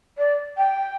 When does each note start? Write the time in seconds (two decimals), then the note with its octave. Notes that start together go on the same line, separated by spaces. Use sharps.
0.18 D5
0.57 G5